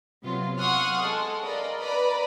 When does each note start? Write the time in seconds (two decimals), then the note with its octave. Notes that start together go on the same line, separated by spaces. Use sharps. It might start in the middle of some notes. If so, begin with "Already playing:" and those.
0.23 C3 F#3 B3 F4
0.58 F#5 C6 C#6 D#6 F6 F#6
1.02 G#3 A4
1.43 A#4 D5 D#5 F5 B5
1.79 B4 D5 A#5 B5